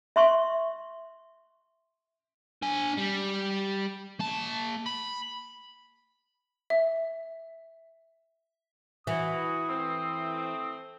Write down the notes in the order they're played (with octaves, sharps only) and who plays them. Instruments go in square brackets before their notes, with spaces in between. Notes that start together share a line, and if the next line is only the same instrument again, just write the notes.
[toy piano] E5 C6 C#6
[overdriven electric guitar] D4 G#5
G3
A#3 A5
B5
[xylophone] E5
[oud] E3 [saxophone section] F#4 [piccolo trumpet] D#6
[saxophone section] A3 C4